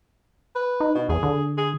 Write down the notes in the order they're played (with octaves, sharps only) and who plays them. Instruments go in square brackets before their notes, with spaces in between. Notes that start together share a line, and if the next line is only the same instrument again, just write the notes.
[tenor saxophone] B4
[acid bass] D#4
[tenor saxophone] B2
[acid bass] E2 [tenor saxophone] G#4
[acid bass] D3
[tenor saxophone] G#4